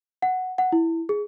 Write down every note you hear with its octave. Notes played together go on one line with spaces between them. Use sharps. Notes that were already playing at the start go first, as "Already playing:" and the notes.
F#5
F#5
E4
G#4